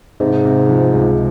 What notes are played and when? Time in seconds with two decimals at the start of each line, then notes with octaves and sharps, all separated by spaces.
0.20 G#2 C3
0.45 C3
0.69 F3
0.93 C#2